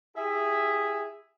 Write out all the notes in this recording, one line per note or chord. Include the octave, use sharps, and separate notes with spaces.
E4 G4 G#4 E5